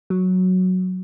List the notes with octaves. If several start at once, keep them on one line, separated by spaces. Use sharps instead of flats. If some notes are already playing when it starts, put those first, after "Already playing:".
F#3